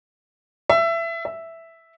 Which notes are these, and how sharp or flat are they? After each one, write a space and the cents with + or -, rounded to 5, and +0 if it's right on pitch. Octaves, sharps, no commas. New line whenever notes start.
E5 +20
E5 +0